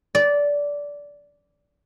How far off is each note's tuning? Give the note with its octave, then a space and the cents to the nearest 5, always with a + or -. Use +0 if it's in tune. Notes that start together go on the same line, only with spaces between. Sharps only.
D5 -15